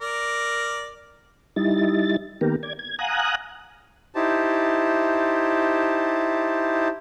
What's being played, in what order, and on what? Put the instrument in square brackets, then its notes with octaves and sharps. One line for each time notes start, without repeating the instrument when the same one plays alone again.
[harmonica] A#4 D5
[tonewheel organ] G3 D#4 E4 A6
D#3 A#3 B3 G4 A#4
D5 G#6
G#6
F5 F#5 G#5 A#5 D#6 F#6
[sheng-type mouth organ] D#4 E4 G4 C5 A5